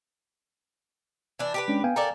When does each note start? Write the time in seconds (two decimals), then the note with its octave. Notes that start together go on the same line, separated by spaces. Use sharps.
1.39 E3 D4
1.54 G4 A#4 B4
1.68 G#3 C#4 D4
1.84 B3 F5 G5 G#5
1.96 A4 A#4 D5 A#5